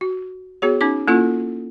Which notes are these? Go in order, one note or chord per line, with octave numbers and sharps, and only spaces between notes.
F#4
B3 F#4 G#4 C#5
C#4 D#4 D6
A#3 C#4 E4 F4 A4